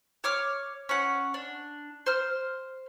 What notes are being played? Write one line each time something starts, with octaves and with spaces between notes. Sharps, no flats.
C#5 D6 F6
C#4 F#5
D4
C5 F6